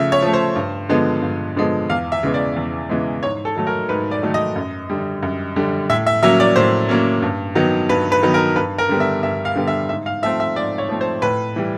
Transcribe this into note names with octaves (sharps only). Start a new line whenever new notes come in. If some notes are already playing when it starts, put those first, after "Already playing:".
Already playing: C#3 F3 A3 E5
C#5
F3 A3
C5
G2
D3 F3 G#3 B3
G2
D3 F3 G#3 B3
E2 F5
E5
C#3 E3 G#3 B3
D5
E2
C#3 E3 G#3 B3
G#2 C#5
A4
D#3 F#3 A3
A#4
G#2 B4
D5
D#3 F#3 A3
D#5
F#2
D3 G3
F#2
D3 G3
A2 E5
E5
F#3 A#3 C#4 E5
D5
A2 C5
F#3 A#3 C#4
G2
D#3 F#3 B3
G2 B4
B4
D#3 F#3 B3
A#4
G2 B4
A#4
D3 G3 B3
E5
G2 E5
F5
D3 G3 B3
E5
G#2 E5
F5
F3 A3 C4 E5
E5
G#2 D5
C#5
F3 A3 C4
C5
A2 B4
E3 G3